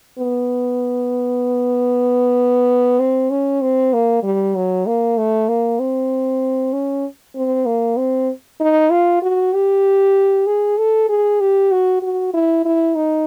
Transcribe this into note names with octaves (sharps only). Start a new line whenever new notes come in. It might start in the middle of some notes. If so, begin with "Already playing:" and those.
B3
C4
C#4
C4
A#3
G3
F#3
A#3
A3
A#3
C4
C#4
C4
A#3
C4
D#4
F4
F#4
G4
G#4
A4
G#4
G4
F#4
F#4
E4
E4
D#4